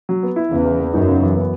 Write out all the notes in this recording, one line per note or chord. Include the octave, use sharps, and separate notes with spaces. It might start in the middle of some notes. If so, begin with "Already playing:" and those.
F#3
B3
E4
E2 C#3
E3
B3
F#2 D#4
C#3
E3
B3